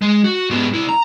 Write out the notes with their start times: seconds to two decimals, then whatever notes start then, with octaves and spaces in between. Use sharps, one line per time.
0.02 G#3
0.24 F#4
0.50 G#2 B3
0.74 C2 E4
0.89 A#5